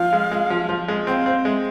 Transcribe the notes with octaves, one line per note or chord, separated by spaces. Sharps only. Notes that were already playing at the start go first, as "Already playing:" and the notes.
Already playing: F3 F5
G#3
G#3
F3
F3
G#3
C4 F5 G5
C4
G#3 E5